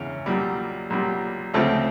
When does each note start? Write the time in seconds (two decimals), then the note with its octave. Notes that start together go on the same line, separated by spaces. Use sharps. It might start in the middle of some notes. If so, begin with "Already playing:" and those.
Already playing: E2 C#3
0.26 B1 A#2 G3
0.90 B1 A#2 G3
1.54 D2 C#3 F3 A3 C4